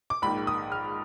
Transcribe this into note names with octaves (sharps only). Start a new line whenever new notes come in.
D6
A#1 G#2 D#3 B5
D#6
F6